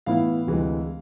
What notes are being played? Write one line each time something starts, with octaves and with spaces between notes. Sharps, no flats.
A2 E3 B3 E4 F5
D2 C3 E3 G#3